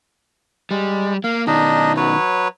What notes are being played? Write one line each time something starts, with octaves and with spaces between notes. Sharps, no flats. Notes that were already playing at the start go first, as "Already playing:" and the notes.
G3 G#3
A#3 F5
B2 D#3 D4 D#4 D#5
F#3 B4 C#5